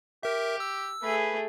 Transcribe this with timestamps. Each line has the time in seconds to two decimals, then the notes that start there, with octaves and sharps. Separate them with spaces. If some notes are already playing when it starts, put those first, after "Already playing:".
0.23 G4 A#4 E5
0.60 E6
1.03 A3 G#4 B4